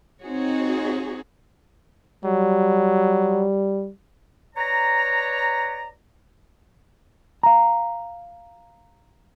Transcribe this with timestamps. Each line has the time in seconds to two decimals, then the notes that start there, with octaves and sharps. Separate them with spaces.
0.21 C4 D#4 F#4 G#4 C#5
2.25 F#3 G3
4.55 B4 C#5 D5 A#5
7.43 F5 A#5